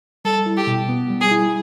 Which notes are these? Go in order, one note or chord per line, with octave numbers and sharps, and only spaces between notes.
G3 A4
E4
G4
B2
B3
G3
G#4
E4